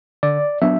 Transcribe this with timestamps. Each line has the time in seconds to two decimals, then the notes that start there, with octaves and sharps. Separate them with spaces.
0.23 D3 D5
0.62 F#3 B3 D4 E5